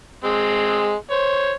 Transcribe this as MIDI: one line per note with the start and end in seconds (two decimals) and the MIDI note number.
0.24 0.93 56
0.24 0.93 60
1.11 1.52 72
1.11 1.52 73